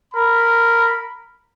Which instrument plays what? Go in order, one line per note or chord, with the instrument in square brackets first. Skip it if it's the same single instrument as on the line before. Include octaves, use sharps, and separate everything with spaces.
[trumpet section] A#4 B5